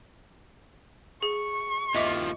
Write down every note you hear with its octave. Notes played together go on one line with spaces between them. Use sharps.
G#4 C#6
D#2 F3 D#5 E5 D6